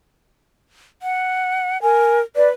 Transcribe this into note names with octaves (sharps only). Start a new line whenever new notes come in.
F#5
A#4 G#5
B4 D5